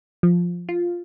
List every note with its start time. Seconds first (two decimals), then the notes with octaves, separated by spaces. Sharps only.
0.23 F3
0.69 F4